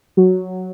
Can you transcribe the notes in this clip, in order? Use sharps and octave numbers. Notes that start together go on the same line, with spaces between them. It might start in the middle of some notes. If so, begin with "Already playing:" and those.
F#3